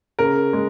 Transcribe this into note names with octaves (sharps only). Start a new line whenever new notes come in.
C#3 A#4
G#3